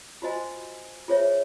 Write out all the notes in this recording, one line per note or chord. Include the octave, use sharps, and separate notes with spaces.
F4 F#4 C5 D#5 G#5
F4 G#4 C5 C#5 E5